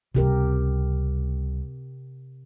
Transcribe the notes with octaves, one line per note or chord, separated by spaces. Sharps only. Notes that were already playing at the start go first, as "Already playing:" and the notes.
C#2 C3 G3 G4 A#4